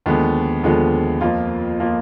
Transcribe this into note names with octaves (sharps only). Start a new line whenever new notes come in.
D#2 D3 F3 G#3 B3
D#2 D3 F3 G#3 B3
F2 F3 A#3 F4
F3 A#3 F4